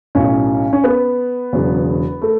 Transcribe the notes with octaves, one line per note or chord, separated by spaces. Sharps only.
B1 A2 F#3 C#4
C#4
B3
E1 E2 C#3 F#3
A3